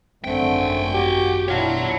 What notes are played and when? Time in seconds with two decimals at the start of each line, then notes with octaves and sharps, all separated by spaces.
0.24 G#1 F#2 D3 A3 C4 F#5 G5
0.94 F#4 G4
1.48 B2 D4 E4 F4 C#5 F#5